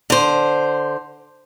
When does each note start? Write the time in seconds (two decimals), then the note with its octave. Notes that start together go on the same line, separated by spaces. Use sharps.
0.10 D3 C5